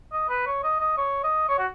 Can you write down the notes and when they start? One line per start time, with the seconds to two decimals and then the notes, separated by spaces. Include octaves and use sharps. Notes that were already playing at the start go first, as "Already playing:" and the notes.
0.12 D#5
0.29 B4
0.47 C#5
0.64 D#5
0.80 D#5
0.98 C#5
1.24 D#5
1.49 C#5
1.59 F#4